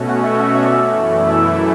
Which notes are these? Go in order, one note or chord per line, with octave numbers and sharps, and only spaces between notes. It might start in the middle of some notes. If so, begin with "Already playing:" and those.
Already playing: B2 A3 C#4 F#4
F#5
E5
E5
E5
D5
E5
F#2 E3 A3 E4
D5
E5
E5